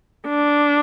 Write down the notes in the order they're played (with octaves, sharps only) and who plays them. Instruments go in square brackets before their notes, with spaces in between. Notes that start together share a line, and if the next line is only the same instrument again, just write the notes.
[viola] D4